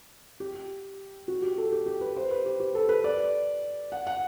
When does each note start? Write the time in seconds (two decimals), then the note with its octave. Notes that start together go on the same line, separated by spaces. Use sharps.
0.40 G4
1.28 F#4
1.42 G4
1.58 A4
1.72 G4
1.86 G4
2.01 B4
2.17 C5
2.31 B4
2.46 G4
2.60 G4
2.75 A4
2.89 B4
3.04 D5
3.92 F#5
4.07 F#5